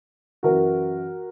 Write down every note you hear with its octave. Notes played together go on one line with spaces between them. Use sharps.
F#2 E3 F#4 A#4